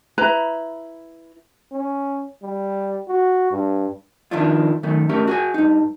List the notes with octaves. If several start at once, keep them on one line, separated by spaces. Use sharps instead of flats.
E4 B4 A#5
C#4
G3
F#4
G2
F2 D#3 F3 D4 E4 F4
F#2 D#3 A3
A3 C#4 G4 A#4
F#4 G#4 G#5
G2 D#4